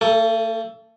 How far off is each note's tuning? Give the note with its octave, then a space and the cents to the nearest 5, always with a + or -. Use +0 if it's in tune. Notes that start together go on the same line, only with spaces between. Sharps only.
A3 +45 A4 +0